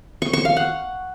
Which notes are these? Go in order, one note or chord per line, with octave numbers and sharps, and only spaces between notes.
C#6
C#6
F5
F#5